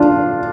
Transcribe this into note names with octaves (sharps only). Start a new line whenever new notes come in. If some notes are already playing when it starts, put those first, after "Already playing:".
Already playing: D4 F4